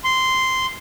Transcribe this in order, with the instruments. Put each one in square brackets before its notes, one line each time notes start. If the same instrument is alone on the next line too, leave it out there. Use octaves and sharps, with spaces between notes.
[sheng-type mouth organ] C6